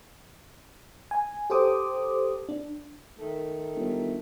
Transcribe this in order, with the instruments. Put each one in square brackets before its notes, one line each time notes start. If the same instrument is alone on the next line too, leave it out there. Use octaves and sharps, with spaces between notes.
[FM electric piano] G#5
G4 A4 C5 D6 D#6
D4
[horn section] D#3 A3
[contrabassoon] G1